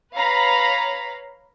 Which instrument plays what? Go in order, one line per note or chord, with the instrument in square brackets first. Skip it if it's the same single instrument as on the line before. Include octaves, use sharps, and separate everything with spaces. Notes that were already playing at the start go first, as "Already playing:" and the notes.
[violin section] B4 C#5 F5 A#5 B5